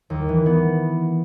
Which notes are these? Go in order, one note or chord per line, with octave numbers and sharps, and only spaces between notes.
D#2
E3
B3